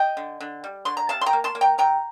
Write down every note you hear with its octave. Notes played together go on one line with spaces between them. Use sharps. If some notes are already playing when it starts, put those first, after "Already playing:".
Already playing: D#5 G5
D3
D3
G3
D3 C6
A#5
C3 F5 A5
C6
G5 A#5
A#3
A5 C6
A#3
G5 A#5
C3 G5 A#5